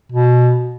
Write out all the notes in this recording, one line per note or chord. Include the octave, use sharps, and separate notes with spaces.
B2